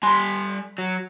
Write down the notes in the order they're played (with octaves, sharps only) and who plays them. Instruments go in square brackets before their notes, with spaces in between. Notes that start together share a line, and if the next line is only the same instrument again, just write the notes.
[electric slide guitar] G3 G#5 [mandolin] B5 C6
[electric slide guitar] F#3